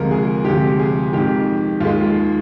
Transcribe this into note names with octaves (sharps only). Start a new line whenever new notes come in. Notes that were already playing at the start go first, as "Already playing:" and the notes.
Already playing: D2 C3 F3 G#3 A#4
G#4
D2 C3 F3 G#3 G4
G#4
F2 D#3 G#3 G4
D#2 D#3 G#3 F4